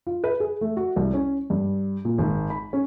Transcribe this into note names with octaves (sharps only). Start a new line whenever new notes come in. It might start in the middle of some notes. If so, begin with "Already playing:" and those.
F4
B4
G#4
A3
F#4
C2
C#4
G2
A#2
G#1
B5
C#4